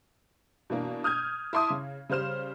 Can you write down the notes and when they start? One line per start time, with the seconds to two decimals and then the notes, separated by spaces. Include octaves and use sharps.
0.70 B2 E3 A#3 D4
1.04 D#6 F6 G6 G#6
1.53 E4 A5 C6 D6 D#6
1.70 C#3
2.10 C#3 G3 C5 F6 E7